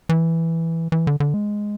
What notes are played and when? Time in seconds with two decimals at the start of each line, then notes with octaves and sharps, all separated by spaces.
0.09 E3
0.92 E3
1.07 D3
1.20 D3
1.34 G#3